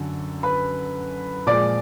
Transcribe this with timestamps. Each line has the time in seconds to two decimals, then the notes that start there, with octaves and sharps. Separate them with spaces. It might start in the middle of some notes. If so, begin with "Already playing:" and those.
Already playing: F#2 D3 F#3
0.43 B4 B5
1.47 A#2 F3 G#3 D5 D6